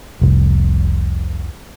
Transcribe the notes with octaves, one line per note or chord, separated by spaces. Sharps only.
F1 C2